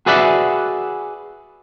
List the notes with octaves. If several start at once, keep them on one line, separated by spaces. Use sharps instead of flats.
F#4 G#4 B4 D5 E5 F#5